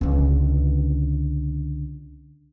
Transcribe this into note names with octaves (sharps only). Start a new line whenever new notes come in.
C#2 D3